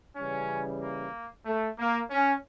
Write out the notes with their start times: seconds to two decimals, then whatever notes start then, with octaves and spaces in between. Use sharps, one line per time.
0.16 C#3 E3 G3 C#4
0.81 A#3
1.46 A3
1.78 A#3
2.10 C#4